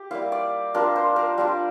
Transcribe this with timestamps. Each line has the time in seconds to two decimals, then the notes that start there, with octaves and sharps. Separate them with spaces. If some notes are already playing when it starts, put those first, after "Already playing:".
Already playing: G4
0.11 G3 A#3 E4 F5
0.32 D5
0.74 G3 D4 F4 A#4
0.96 C5
1.16 A#4
1.38 G3 D4 F4